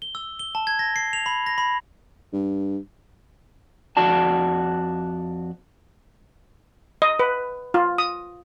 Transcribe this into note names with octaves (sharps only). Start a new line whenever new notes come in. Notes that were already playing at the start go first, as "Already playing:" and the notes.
G7
E6
G7
A5
G#6
A#6
C7
F7
B5
A#6
B5
G2
F2 F#4 D5 A5
D#5
B4
F4
D#6